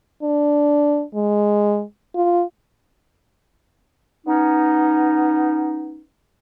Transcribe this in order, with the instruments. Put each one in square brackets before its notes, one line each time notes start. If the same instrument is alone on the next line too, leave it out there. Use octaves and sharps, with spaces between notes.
[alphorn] D4
G#3
F4
[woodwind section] B3 C#4 D#4